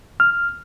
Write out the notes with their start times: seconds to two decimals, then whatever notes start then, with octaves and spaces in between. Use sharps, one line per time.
0.20 F6